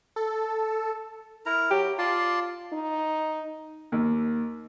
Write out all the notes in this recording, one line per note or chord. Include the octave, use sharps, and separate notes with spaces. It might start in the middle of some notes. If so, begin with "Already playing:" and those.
A4
E4 A#4 A#5
F#3 G4
F4 D5 A5 C6
D#4
D#2